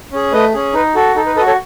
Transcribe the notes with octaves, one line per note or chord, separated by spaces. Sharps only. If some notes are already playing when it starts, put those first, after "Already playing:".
C#4 G#4
A3 B4 D#5
C#4 G#4
D#4 B4
F#4 A4
D#4 A4
B4
A4 B4 D#5
F#4
A4 C#5